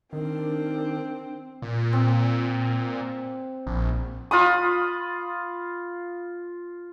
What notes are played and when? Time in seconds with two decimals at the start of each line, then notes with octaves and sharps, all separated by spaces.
0.13 D#3 C4 D4 A#4
1.62 A#2
1.93 C4
3.67 A#1
4.31 F4 B5 D#6